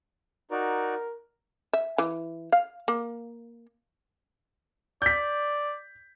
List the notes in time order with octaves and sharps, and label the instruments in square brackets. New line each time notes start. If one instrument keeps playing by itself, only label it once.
[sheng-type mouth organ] D#4 F#4 D5 [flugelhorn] A#4
[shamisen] E5
E3
F5
A#3
[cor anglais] D5 [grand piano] G6 B6